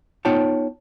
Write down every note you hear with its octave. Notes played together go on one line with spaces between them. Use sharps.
B3 D#4 F4 C#5 G5 A5